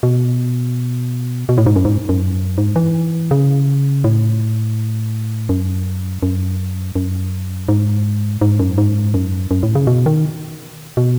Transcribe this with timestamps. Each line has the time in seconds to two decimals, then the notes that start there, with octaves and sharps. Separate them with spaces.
0.03 B2
1.49 B2
1.58 A2
1.66 G#2
1.76 F#2
1.85 G#2
2.09 F#2
2.58 G#2
2.76 E3
3.31 C#3
4.04 A2
5.49 F#2
6.23 F#2
6.96 F#2
7.69 G#2
8.41 G#2
8.60 F#2
8.78 G#2
9.14 F#2
9.51 F#2
9.63 A2
9.75 C#3
9.87 B2
10.06 D#3
10.97 B2